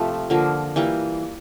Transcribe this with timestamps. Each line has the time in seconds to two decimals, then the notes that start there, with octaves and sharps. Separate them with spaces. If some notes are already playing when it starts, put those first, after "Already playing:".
Already playing: C3 F3 A3
0.30 D3 F3 A#3
0.76 E3 G3 A#3